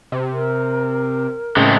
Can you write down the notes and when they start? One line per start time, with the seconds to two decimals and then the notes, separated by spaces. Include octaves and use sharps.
0.12 C3
0.32 A#4
1.56 A2 C#3 G#3 A3 C4